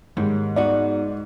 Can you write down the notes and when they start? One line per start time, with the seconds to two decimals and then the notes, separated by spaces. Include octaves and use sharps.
0.17 D#2 G#2 G3 C#4
0.56 B3 D#4 F#4 D5